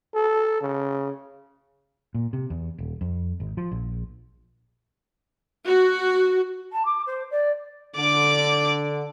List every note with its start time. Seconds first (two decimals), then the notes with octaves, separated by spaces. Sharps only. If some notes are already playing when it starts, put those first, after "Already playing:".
0.15 A4
0.62 C#3
2.15 A#2
2.33 C3
2.50 E2
2.78 D#1
3.01 F2
3.40 G#1
3.57 F3
3.72 A#1
5.66 F#4
6.72 A5
6.85 D6
7.06 C5
7.31 D5
7.96 D3 D5 D6